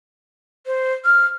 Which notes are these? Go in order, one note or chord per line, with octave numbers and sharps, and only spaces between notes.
C5
F6